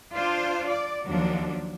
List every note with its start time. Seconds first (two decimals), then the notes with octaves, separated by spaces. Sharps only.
0.13 D4 F4 C5
0.66 D5
1.08 D#2 F3 F#3 D4